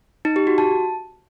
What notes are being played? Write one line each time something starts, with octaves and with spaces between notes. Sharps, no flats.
D#4
G4
F#4
A5